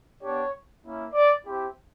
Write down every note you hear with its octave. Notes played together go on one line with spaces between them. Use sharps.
B3 D4 G4 C#5
A#3 C#4 E4
D5
C4 E4 G4